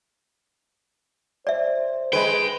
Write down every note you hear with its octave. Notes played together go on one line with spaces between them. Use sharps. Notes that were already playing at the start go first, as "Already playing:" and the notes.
C5 D5 E5
G#3 B4 G5